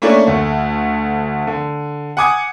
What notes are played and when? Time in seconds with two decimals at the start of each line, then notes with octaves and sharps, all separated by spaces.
0.02 A3 A#3 C#4 D4 E4 A4
0.27 D2 A3
1.47 D3
2.17 F#5 G#5 D6 D#6 G#6 C#7